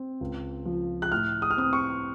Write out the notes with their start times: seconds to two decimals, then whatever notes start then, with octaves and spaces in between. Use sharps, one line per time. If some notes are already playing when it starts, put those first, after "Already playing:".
Already playing: C4
0.21 C#2
0.66 F3
1.02 F#6
1.12 A2 F6
1.42 D#6
1.51 F6
1.57 C4 D#6
1.73 C#6